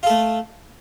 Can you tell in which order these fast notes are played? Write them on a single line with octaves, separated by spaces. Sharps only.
F4 A4 A3